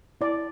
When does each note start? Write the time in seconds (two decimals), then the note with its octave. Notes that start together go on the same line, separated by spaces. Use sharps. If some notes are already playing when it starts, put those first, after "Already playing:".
0.21 E4 D5